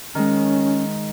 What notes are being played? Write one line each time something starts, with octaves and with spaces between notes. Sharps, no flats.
D#3 G#3 C#4